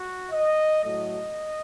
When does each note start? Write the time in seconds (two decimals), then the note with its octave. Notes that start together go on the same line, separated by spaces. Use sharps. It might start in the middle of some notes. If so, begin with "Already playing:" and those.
Already playing: F#4
0.31 D#5
0.83 A2 F#3 A3 D#5